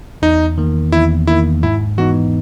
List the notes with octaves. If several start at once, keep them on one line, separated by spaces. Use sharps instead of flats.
E2 D#4
D#3 A#3
E2 E4
D#3 A#3 E4
G#2 E4
E3 B3 D#4 F#4